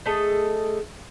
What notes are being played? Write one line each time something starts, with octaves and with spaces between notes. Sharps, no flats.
A3 G#4 A4 D#5